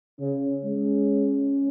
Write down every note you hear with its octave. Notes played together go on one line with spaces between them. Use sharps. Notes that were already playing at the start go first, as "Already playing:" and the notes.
C#3 C#4
G#3 C#4